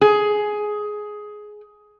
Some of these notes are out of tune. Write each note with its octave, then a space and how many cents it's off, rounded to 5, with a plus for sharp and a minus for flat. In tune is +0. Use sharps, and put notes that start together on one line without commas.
G#4 +10